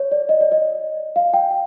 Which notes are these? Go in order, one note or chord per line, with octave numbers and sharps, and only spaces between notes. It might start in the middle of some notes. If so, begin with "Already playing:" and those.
Already playing: C#5
D5
D#5
D5
D#5
F5
G5